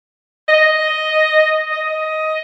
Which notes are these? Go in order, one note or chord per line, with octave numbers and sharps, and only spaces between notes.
D#5
D#5